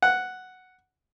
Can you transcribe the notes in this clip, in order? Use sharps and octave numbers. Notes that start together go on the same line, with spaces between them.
F#5